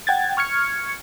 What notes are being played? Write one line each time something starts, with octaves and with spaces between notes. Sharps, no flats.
F#5 G5 G#6 A6
C#6 F6 G#6 C#7